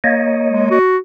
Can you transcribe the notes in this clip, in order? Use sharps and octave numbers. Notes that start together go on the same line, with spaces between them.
A#3 C#5 D#5
G#3
F#4